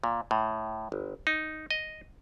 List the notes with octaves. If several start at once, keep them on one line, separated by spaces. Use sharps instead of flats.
A#2
A2
G1
D#4
D#5